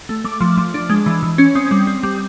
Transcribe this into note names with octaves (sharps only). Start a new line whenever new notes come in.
A3
A3 D6
F3
F3
D4
G#3
E3
E3
C#4
C4 D#6
G3
C4
G3